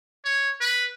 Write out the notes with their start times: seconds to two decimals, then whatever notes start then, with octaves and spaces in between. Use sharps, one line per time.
0.25 C#5
0.61 B4